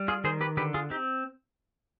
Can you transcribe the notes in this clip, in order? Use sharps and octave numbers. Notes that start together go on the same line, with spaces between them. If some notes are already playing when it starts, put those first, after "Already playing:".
Already playing: G3
F4 G#4
D#3 G#4 C5
G4 B4
D3 G4 B4
F4 G#4
C4 D#4 G4